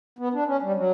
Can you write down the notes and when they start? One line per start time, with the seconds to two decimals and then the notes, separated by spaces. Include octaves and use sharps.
0.19 B3
0.34 D4
0.47 C#4
0.62 G3
0.76 F#3